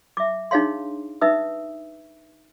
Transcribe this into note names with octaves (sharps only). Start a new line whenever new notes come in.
E5 D6
D4 D#4 G#4 C#5 F5 C6
D#4 B4 E5 D#6 E6